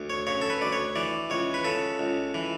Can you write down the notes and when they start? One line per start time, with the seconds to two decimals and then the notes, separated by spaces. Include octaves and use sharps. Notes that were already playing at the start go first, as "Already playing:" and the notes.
Already playing: D2
0.10 C#5
0.27 C#3 C#5
0.41 A4
0.50 B4
0.61 D2 D5
0.73 C#5
0.96 E3 D5
1.30 C#2 C#5
1.54 B4
1.64 C#3 A4
1.99 C#2
2.34 E3